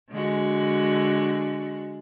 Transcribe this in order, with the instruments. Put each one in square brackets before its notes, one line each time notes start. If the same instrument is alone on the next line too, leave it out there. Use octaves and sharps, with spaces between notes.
[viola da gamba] D3 G#3 F#4